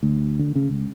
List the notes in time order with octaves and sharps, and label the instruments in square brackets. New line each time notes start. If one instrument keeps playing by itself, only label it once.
[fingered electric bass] D2
D3
C#3
C#2